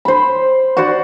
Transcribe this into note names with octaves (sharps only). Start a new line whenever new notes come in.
C5 B5
F#4 C5 D5 F#5